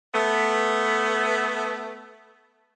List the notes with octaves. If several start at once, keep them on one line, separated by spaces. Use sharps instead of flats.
A3 B3